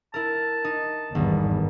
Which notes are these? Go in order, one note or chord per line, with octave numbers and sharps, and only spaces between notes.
E4 A#4 A5
D#4
G#1 E2 G2 D#3